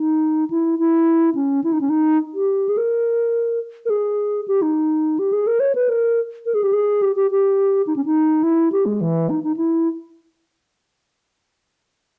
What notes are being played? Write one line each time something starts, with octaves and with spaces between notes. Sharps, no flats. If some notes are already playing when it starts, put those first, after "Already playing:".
Already playing: D#4
E4
E4
C#4
E4
D#4
C#4
D#4
G4
G#4
A#4
A#4
G#4
G4
D#4
G4
G#4
A#4
C#5
B4
A#4
A#4
G#4
G4
G#4
G4
G4
G4
D#4
C#4
D#4
E4
G4
G#3
E3
D#4
D#4
E4